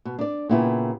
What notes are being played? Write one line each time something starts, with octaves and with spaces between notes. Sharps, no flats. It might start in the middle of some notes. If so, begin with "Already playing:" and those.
B2
D4 D5
A#2 C#3 B3 E4 G4